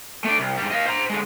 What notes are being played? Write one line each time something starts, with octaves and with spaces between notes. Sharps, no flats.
A3 D5
C2
G#2 G3
D#5 F5
C5 A#5
D3 G#3